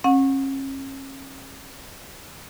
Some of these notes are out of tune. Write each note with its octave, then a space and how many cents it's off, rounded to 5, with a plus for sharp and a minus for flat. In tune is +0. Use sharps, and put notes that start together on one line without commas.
C#4 -40 F#5 -25